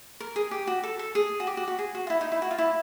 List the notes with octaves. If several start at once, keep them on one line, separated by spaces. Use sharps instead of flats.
A#4
G#4
G4
F#4
A4
A4
G#4
F#4
G4
F#4
F#4
G#4
F#4
F4
E4
D#4
E4
F#4
F4
E4